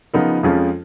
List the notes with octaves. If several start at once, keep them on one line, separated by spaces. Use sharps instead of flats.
C#3 F3 B3 D#4 A#4
F2 F3 G#3 C#4 F4